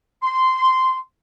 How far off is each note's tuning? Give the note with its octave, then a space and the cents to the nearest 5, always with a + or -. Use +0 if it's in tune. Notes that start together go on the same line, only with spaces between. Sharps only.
C6 -10